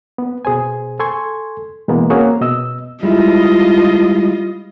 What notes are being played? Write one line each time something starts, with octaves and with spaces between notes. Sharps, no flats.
B3
B2 G#4 C5 G#5
A4 G#5 C6 C#6 G#6
B2 E3 G#3 A#3 B3
A#3 C4 C#4 F#4 G#4 C#5
B2 D#5 E6
G3 G#3 E4 F4 D#5